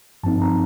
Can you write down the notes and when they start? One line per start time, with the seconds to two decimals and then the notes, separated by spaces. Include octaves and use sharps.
0.23 G2 F3 C4 D#4 A5
0.42 A#5